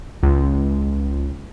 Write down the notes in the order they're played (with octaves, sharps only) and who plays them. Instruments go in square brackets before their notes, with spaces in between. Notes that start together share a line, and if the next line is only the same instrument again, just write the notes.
[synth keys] C#2